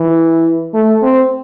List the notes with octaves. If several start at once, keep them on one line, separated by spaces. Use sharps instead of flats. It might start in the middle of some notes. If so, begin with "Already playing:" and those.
Already playing: E3
A3
C4